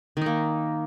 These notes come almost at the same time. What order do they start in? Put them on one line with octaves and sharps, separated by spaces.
D#3 D#4 A#3